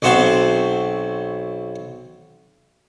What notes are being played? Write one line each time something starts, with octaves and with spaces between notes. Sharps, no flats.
B1 C4 F#4 C5 A5